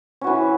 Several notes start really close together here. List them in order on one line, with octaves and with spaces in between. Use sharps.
C#4 F#4 E3